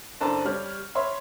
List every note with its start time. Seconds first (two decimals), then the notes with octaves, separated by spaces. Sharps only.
0.21 F#1 D4 A4 C5 A5 A#5
0.45 G3 C#5 F6
0.95 C#5 E5 B5 C6